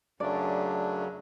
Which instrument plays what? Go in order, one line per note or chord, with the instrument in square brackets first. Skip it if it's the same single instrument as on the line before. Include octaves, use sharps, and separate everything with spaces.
[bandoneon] F#2 C#3 F#3 A3 D4 [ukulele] D5